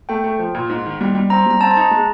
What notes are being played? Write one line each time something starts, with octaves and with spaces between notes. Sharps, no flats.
A3 G5
A3
F3
A#2
G#2
D#3
G3
G3
C4 A#5
G3 A#5
C4 A5
A5
D#4 A#5
G#3